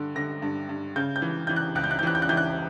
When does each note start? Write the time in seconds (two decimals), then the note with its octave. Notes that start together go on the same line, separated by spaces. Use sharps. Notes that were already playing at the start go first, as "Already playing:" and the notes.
Already playing: G2 D3
0.15 D3 A#6
0.42 G2
0.69 G2
0.96 C#3 G6
1.16 G6
1.22 E3
1.47 E3 G6
1.56 F#6
1.75 C#2 F#6
1.84 G6
1.91 F#6
1.99 G6
2.03 E3 F#6
2.15 G6
2.22 F#6
2.29 E3 G6
2.37 F#6